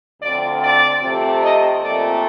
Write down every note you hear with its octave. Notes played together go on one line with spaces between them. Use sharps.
D2 D3 F3 C4 D5
D5
C3 F3 A3 C4
D#5
A#2 F3 A3 C4 D5